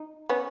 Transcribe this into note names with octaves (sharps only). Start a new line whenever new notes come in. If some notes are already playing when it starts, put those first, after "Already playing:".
Already playing: D#4
B3 C#4